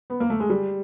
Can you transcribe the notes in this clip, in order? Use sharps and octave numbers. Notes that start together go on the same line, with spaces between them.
B3
A#3
A3
G#3
G3